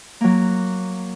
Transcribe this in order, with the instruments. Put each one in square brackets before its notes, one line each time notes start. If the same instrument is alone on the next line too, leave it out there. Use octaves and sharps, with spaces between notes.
[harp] F#3 A#3